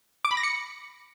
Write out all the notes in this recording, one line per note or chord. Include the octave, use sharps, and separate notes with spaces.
D6
B5
A#6
C#7